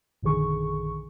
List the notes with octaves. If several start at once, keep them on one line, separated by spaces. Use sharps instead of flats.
A#1 F#2 D3 D#3 G#4 C#6